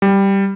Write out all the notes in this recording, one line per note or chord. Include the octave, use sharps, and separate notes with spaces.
G3